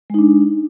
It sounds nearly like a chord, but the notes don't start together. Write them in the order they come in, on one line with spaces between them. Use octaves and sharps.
G#3 D#4 D4